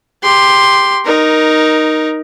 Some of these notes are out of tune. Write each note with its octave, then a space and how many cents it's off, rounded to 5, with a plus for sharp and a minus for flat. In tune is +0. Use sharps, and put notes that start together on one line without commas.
G4 +10 C6 +0
D#4 +0 A#4 +15